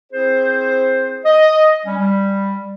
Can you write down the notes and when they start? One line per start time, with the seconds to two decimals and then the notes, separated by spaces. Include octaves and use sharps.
0.12 C4 E4 G#4 C5
1.24 D#5
1.85 G3 C#4
1.98 G3